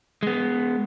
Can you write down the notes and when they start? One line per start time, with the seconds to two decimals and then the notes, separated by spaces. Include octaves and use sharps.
0.23 G#3 B3